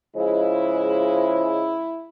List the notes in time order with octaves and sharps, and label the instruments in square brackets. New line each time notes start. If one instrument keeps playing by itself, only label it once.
[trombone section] C#3 F3 G#3 [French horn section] E4